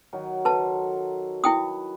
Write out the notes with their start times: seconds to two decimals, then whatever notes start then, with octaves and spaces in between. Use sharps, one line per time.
0.13 D#3 F#3
0.45 A4 B4 C5 A5 A#5
1.44 E4 B4 G5 D#6